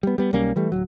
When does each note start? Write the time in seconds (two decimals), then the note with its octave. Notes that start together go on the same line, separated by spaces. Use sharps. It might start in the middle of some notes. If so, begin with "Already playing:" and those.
0.03 G3 B3
0.18 G3 B3
0.33 B1 G3 A#3 C#4
0.56 E3 G3 A3
0.72 D1 F#3